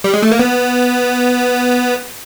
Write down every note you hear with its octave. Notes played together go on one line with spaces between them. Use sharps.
G3
G#3
A3
A#3
B3